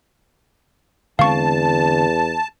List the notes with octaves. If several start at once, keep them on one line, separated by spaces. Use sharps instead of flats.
E2 D3 G#3 C4 F5 A5 C#6